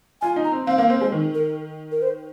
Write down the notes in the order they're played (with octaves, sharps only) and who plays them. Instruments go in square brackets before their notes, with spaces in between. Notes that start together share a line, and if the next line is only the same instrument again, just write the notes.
[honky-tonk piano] F4 [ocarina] G#5
[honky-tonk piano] D#4
[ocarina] A#5
[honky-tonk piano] C4
[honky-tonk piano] C4 [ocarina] F5
[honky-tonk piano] A#3 [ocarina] F5
[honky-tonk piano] C4 [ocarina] C5
[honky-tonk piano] G#3 [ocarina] C5
[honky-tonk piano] D#3
[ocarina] A#4
A#4
C5